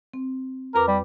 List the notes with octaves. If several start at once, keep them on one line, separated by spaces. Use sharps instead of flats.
C4
F2 A#4 B4 D6
G3